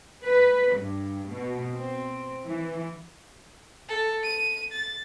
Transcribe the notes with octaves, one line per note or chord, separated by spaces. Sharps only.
B4
G2
B2
C4
E3
A4
D#7
A6